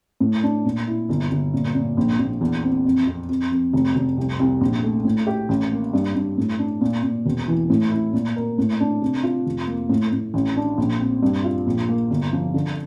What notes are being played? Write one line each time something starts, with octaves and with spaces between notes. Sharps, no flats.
A2
D4
A#2
E4
G1
G1
A#2
A#2
A#1
A#1
E2
C4
F2
F2
F2
F2
F1
F1
C2
C2
A#1
A3
A2
G4
A1
A#3
G2
G2
A2
D4
A#2
A#2
E1
E3
A2
E4
A#2
A#4
A2
D4
C3
F4
F1
A#3
A2
A2
A1
D4
A#1
C4
G2
F4
A#1
A#3
G1
F3
D3